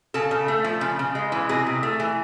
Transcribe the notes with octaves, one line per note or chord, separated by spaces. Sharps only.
C#3 A4
C#3
A3
F3
C#3
C#3
G#3
E3
C3 G#4
C3
A3
E3